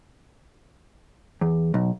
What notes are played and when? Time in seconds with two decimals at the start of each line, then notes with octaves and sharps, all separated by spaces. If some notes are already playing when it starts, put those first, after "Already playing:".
1.41 E2
1.74 B1